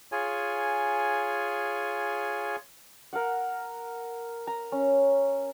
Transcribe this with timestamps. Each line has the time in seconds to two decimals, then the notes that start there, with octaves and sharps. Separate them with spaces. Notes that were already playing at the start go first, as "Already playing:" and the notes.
0.12 F4 G#4 C#5 G#5
3.13 A#4 F5 F#5
4.47 A#5
4.72 C#4